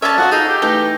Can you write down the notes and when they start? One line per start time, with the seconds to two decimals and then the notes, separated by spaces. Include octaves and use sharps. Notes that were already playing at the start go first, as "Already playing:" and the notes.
0.02 C#4 A4 D5 E5 A5
0.18 F3 D#4 F4 F#4
0.32 D#4 G#4 A4 F5
0.49 G4
0.62 E3 A3 D#4